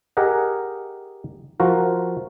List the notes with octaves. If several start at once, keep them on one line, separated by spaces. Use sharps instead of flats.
G4 G#4 A#4 D#5 F#5
F3 F4 F#4 A#4